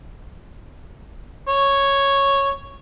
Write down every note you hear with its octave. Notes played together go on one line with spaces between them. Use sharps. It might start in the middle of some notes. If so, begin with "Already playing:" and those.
C#5